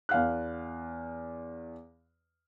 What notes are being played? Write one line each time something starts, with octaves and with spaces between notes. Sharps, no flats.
E2 F5 F#6